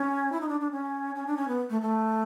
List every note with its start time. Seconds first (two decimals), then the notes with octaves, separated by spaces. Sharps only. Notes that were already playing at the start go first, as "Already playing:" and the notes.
Already playing: C#4
0.32 E4
0.41 D#4
0.49 D4
0.61 D4
0.72 C#4
1.15 C#4
1.27 D4
1.37 C#4
1.48 B3
1.70 A3
1.81 A3